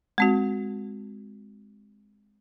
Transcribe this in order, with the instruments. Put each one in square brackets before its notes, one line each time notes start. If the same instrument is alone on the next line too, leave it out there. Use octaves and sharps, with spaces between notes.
[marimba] G#3 C4 F#4